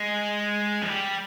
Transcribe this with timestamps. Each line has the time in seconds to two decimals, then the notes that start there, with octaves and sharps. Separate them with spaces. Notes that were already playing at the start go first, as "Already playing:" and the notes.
Already playing: G#3
0.82 F3
0.88 G3